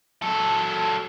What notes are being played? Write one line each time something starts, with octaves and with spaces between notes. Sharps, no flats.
F#3 A4